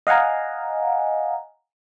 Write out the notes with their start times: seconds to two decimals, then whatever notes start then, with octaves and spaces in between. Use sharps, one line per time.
0.07 D#5 F5 F#5 G#5 A#5